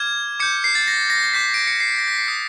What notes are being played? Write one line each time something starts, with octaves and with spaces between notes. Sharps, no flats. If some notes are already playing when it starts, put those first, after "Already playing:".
Already playing: D6 F6 G#6
D6 G6 C#7
C7
A6
A#6
A#6
D6 G6 B6
D7
C#7
C7
A#6
B6
C7
D#6 G6 C#7